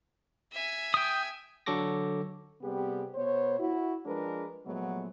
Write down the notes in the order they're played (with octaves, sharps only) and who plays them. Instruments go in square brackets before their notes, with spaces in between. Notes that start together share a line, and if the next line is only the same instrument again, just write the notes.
[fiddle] E5 G#5
[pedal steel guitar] G5 D#6
[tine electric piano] D3 F#3 A4 C#6 D6 A#6
[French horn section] C3 G3 B3 C4 G4 G#4
B2 B3 C5 C#5
E4 F#4
F3 G#3 D4 G#4 A#4 B4
A#2 F3 F#3 G#3 A3 B3